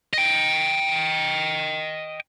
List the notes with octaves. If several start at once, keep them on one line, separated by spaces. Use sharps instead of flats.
D#5 G5